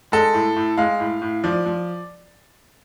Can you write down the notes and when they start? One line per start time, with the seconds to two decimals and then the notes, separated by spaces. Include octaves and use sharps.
0.12 G#3 A4
0.34 A2
0.56 A2
0.77 G#3 F5
1.00 A2
1.22 A2
1.44 F3 D5
1.66 F3